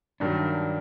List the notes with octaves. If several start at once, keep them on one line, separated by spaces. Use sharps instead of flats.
G2 D#3 F#3 D4